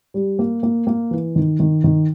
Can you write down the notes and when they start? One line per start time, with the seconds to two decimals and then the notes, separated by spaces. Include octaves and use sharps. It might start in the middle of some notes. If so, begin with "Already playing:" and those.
0.14 G3
0.39 A#3
0.63 A#3
0.87 A#3
1.11 E3
1.36 D#3
1.60 D#3
1.84 D#3